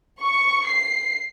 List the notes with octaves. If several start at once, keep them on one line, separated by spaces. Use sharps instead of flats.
C#6
C7